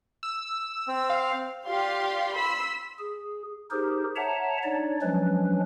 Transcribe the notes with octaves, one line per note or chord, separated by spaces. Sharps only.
E6
C4
F5
F4 G4 D5 F5 C6
B5 C6 E6 B6
G#4
D#4 G4 G#4 A#4 C5
C#5 E5 F#5 A5 A#5
D4 D#4 C#5 D5
F3 F#3 G#3 C#4 D4 B4